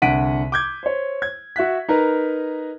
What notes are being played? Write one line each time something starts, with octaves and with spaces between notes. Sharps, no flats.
C2 D3 F#5 B6 D7 D#7
D6 G6 G#6
C5 C#5
G#6
F#4 E5 F#6 B6
D#4 A#4 B4